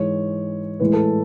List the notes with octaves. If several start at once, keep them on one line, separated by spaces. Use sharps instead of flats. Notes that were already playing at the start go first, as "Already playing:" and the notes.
Already playing: G#2 E3 G#3 C#5
A2 E3 G#3 B4
A4